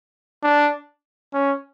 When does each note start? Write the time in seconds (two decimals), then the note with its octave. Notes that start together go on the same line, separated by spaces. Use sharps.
0.43 D4
1.34 C#4